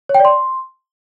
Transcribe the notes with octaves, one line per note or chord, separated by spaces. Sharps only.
C#5
G5
D5
C6